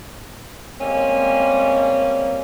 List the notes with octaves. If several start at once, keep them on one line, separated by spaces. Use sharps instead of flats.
G3 G#3 A#3 C4 C#4